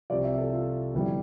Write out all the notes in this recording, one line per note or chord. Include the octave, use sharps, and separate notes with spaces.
C2 C3 F3 C4 D5
E5
A4
F4
G1 F2 E3 G3